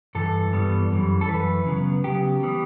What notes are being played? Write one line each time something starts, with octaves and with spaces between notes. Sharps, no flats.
G2 E3 A4
G2 E3 G3 B3
F#2 E3 G3
A4
F#2 E3 B4
C#3 F#3 B3
C#3 F#3 B3 G4
E3 G3 B3